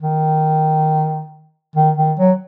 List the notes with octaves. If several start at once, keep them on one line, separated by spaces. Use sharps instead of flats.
D#3
D#3
D#3
F#3